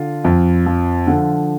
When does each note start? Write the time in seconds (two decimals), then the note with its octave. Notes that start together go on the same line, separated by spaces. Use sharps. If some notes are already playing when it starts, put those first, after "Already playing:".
Already playing: D3 F4
0.24 F2
0.66 F3
1.07 D3